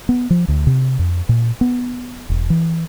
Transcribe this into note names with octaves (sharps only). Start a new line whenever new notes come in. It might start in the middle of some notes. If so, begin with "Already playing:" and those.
B3
F3
D2
C3
F2
A#2
B3
E1
E3